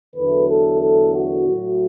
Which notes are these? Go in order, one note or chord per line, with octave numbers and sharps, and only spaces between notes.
E2 D3 F#3 A3 B4
A4
A4
F#4
A2 F#3 A3